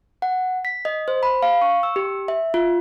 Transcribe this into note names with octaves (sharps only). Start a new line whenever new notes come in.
F#5
B6
D#5
C5
B5
F5
C#6
E6
G4
E5
F4